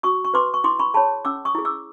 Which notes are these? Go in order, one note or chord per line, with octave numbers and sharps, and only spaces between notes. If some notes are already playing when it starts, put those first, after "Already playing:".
F#4 C#6 D#6
C#6
B4 C6 D6
C#6
E4 C6 D6
B5 C#6
G#4 C#5 A5 B5
C#4 D6 E6
C#6 D#6
E4 G#4
D6 E6